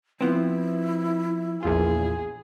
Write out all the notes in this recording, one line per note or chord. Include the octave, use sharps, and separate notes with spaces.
F3 B3 C4 E4
A#1 E2 F4 G#4